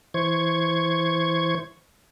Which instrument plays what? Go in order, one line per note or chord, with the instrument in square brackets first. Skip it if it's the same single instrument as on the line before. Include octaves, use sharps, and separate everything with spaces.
[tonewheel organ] E3 C5 C#6 G#6